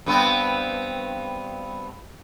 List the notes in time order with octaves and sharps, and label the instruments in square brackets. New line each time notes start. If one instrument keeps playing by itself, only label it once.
[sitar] G2 B3 C4